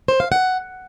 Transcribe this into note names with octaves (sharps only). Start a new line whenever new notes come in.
C5
F5
F#5